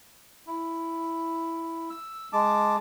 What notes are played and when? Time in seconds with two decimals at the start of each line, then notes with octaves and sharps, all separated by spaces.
0.47 E4
1.90 E6
2.33 G#3 A5 D6